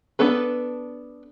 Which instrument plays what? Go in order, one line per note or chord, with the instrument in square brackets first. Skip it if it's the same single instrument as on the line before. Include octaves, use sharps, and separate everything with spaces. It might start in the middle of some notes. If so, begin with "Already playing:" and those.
[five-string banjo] B3 D4 A4 B4